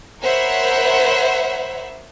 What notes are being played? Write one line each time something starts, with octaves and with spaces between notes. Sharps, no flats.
A#4 C5 C#5 E5 F#5 B5